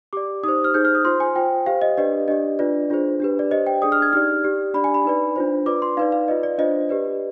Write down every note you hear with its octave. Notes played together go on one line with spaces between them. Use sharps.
G4 D5 D6
D#4 G4 C5 D#6
F6
D#4 G#4 C5 G6
F6
D#6
F4 C5 C6
G#5
F4 C5 G5
G4 C5 F5
D#5
D4 G4 B4 D5 D#5
D4 G4 D5 D#5
D4 F4 B4 D5
D4 F4 G#4 C5
D4 G4 B4
D5
G4 C5 D#5
G5
D4 G#4 D5 D#6
F6
G#6
D#4 G4 D5 F6
G4 D5
D4 G4 D5 B5
G#5
B5
D#4 B4 D5
D4 F4 C5
F4 B4 D5 D6
C6
D#4 B4 D5 F5
F5
F4 B4 D5 D#5
D5
D4 F4 C5 D#5
G4 B4 D5